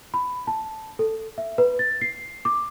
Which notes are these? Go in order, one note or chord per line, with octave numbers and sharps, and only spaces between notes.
B5
A5
A4
E5
B4
A6
C7
D6